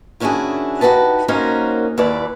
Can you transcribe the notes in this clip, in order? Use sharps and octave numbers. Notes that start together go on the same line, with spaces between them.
D#3 C#4 D4 E4 F#4 G#4
D#4 F#4 G4 B4 A5
A#3 C#4 D#4 F#4 A#4 C5
D#2 E3 B4 D5